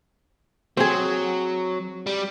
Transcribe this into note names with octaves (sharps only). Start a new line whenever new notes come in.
F#3 C4 G#4
G3